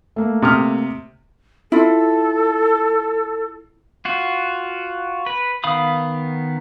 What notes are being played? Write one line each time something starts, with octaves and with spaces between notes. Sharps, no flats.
A3 A#3
C3 D#6 F6
E4 F4 A4
F4 F#4
B4
D#3 B3 F5 B5 D#6